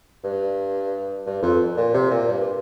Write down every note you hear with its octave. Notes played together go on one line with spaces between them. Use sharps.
G2
G2
F2
A#2
C3
A#2
G2